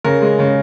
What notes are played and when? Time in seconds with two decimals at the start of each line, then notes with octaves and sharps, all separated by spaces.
0.04 C#3 A#4
0.22 G#3
0.39 C#3